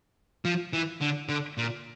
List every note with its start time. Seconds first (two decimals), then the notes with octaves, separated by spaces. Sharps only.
0.45 F3
0.73 E3
1.01 D3
1.29 D3
1.58 A#2